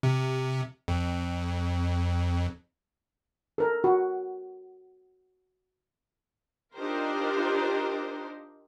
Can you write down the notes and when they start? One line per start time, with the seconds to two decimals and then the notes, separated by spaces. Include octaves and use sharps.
0.03 C3
0.88 F2
3.58 A4 A#4
3.84 F#4
6.76 D4 D#4 F4 G4 A#4 C5